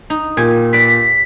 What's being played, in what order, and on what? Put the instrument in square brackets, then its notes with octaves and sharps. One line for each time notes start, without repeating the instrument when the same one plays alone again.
[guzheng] D#4
[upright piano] A#2 [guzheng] G4 G#5
[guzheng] B4 D5 [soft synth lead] B6